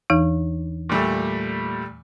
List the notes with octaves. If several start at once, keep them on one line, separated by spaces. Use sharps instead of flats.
E2 E3 D#4
A#2 G3 A3